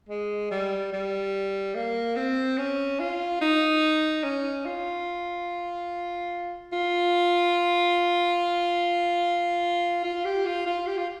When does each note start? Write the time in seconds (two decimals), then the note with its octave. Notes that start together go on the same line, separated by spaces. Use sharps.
0.09 G#3
0.51 G3
0.93 G3
1.75 A#3
2.16 C4
2.58 C#4
3.00 F4
3.41 D#4
4.24 C#4
4.65 F4
6.72 F4
10.04 F4
10.25 G4
10.46 F4
10.66 F4
10.87 G4
10.97 F4